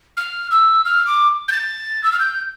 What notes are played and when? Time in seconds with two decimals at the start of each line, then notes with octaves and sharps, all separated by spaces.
0.17 F6
0.51 E6
0.85 F6
1.07 D6
1.48 G6
1.52 A6
2.04 E6
2.12 F6
2.20 G6